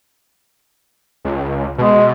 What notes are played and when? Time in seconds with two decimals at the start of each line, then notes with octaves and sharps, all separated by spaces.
1.25 C#2
1.78 B2 G#3